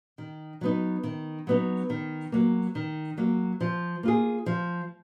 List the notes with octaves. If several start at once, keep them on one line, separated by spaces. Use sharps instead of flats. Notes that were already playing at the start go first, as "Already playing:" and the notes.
D#3
F#3 B3 D#4
D#3
F#3 B3 D#4
D#3
F#3 A#3
D#3
F#3 A#3
F3
A#3 F4 G#4
F3